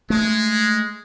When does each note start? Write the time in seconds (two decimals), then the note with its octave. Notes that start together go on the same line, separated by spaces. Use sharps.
0.10 G#3 A3